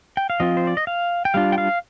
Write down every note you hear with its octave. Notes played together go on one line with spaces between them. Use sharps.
G5
F5
F3 C4 F4 D#5
C5
D5
D#5
F5
G5
G3 D4 F4 F5
G5
F5